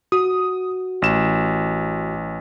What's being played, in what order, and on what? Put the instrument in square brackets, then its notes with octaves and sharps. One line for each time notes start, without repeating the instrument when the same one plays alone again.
[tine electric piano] F#4 [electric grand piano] D#6
[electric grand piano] A1 E7